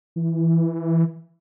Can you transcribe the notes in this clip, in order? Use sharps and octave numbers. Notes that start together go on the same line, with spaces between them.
E3